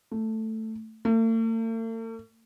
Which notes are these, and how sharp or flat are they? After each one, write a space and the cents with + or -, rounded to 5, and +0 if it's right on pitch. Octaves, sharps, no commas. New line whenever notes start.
A3 +5
A3 +45